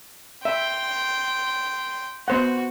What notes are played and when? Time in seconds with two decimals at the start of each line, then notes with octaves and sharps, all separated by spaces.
0.45 E5 G5 C6
2.28 B3 F#4 C5 F#5